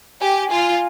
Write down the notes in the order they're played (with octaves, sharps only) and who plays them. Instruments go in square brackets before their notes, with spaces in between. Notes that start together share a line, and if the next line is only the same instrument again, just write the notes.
[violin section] G4 [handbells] G#5
[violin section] F4 [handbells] G#5